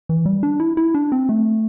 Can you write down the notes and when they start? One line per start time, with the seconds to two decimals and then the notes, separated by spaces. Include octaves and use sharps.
0.09 E3
0.26 G3
0.43 D4
0.60 E4
0.77 E4
0.95 D4
1.12 C4
1.29 A3